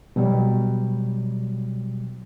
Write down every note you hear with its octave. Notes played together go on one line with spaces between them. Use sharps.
B2 F#3 G3